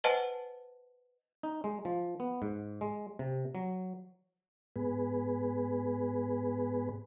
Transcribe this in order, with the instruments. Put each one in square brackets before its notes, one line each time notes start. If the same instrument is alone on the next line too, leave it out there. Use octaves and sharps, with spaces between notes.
[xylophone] B4 C5 D#5 F#5 G#5 A5
[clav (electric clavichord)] D#4
G#3
F3
B3
G#2
G#3
C3
F#3
[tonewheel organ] G#2 B3 G#4 B4